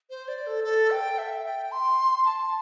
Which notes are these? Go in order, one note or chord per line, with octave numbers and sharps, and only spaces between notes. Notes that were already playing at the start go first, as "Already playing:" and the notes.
C5
D5
A4
A4
G5
E5
G5
C6
A5